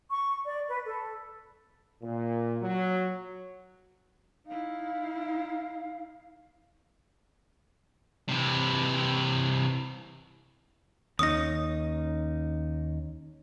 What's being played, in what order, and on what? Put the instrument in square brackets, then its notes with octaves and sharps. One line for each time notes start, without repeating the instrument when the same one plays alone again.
[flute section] C#6
D5
B4
A4
[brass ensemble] A#2
F#3
[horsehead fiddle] D#4 E4 [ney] F5
[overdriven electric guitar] C3 E3
[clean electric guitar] D#2 C#4 D#4 [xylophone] D#6 A#6